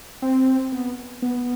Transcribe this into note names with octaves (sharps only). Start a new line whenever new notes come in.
C4
B3
B3